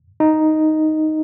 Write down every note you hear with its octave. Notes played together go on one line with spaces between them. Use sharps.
D#4